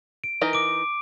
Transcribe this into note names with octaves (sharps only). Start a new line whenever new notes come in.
D7
E3 D#4 A#4
D6 D7